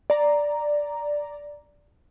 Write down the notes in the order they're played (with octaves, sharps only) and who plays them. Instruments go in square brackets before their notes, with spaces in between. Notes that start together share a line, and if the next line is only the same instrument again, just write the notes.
[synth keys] D5 A#5